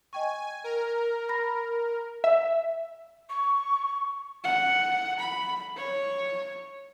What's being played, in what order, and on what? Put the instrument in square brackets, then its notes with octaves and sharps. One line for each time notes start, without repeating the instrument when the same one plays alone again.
[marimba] D#5 G5 C#6 [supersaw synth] G#5
[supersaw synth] A#4
[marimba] A#5 B5 A#6
[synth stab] E5
[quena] C#6
[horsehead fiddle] F#5
B5
C#5